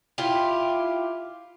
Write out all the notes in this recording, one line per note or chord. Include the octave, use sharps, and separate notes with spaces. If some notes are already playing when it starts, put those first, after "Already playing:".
E4 F4 G4